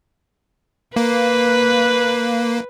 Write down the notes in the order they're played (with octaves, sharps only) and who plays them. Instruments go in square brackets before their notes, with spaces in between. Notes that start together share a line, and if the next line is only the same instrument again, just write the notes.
[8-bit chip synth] A#3 [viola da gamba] B4